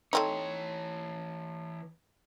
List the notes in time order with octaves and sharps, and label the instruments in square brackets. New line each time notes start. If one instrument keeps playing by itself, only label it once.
[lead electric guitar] E3 C#5 [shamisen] A3 C4 D#4